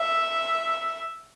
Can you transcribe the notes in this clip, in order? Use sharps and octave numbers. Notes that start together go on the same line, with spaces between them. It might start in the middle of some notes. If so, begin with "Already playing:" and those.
Already playing: E5